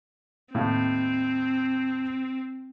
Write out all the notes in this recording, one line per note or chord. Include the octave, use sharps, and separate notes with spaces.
D#2 A2 C4 F5